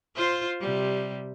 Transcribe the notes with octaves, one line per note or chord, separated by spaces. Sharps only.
F4 C5
C3 G3